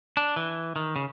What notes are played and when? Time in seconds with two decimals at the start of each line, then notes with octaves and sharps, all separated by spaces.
0.17 D4
0.36 E3
0.76 D#3
0.96 C#3